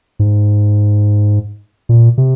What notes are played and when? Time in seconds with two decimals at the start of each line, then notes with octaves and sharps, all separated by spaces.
0.19 G#2
1.89 A#2
2.18 C3